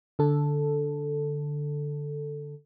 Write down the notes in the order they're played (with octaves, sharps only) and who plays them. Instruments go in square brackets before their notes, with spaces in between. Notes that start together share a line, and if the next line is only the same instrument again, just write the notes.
[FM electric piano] D3 A4